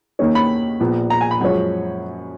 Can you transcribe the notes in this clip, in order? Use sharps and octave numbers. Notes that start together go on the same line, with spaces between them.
D#2 D#3 A#3 C#4
B5
A#1 A#2 F3 B3
A#5
G#5
B5
F#2 F3 G#3 C#4